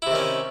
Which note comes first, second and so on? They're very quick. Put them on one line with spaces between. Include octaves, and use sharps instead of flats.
E4 C3 D#3 C#4